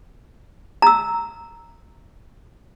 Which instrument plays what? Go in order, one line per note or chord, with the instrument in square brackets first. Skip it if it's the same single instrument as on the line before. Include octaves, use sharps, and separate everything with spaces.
[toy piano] A#5 E6